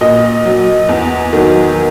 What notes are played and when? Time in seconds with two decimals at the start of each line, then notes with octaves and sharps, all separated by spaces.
0.01 A#2 D#5
0.46 F#3
0.89 E2
1.33 D#3 F#3